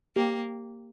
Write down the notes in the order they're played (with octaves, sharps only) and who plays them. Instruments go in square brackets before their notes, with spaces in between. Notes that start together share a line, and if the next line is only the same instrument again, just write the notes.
[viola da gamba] A#3 [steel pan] G4